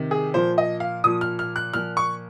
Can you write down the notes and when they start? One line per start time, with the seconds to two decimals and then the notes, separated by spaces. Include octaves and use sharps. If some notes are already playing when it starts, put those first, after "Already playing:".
Already playing: C3 D#3
0.11 G#4
0.34 A#2 F3 C5
0.58 D#5
0.80 F5
1.04 A#2 F3 D#6
1.21 F6
1.39 F6
1.56 F#6
1.73 A#2 F3 F6
1.97 C#6